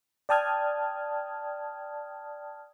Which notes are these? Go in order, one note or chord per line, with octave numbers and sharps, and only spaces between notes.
D5 G5 A5 D#6 F6 G#6